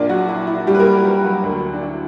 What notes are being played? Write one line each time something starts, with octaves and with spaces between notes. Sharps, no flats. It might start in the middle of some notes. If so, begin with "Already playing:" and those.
Already playing: A#1 A#2 A#3 D4 D5
F#3 F#4
E4
E4
G3 G4
B4
A#3 A#4
A#3 A#4
G3 G4
F#3 F#4
D2 D3 A#3
D4
E4